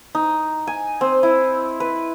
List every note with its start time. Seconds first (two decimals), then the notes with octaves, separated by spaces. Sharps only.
0.15 D#4
0.67 G#5
1.01 C4
1.23 E4
1.80 B4